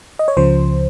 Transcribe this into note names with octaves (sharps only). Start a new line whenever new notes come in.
D#5
C#5
C#2 C#3 F3 C5